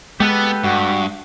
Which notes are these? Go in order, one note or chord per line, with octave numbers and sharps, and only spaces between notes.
G#3 B3 G4 A4 B4
G2 F#4